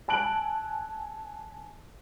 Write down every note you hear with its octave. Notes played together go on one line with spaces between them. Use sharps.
G#5 A5 F#6 D7 F#7